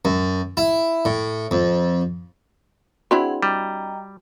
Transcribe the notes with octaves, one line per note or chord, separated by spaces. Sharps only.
F#2
E4
A2
F2
C4 D4 E4 F#4 G#4 F#5 B5 C6
G3 D#5 G5 A#5